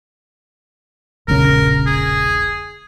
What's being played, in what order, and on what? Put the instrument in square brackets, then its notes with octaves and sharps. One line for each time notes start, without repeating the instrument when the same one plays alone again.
[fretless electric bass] E1 A#1 C#3 [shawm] A#4
[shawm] G#4